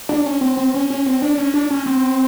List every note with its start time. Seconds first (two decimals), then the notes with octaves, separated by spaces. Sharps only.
0.09 D4
0.26 C#4
0.41 C4
0.57 C4
0.74 C#4
0.90 C#4
1.06 C4
1.22 D4
1.38 C#4
1.54 D4
1.71 C#4
1.86 C4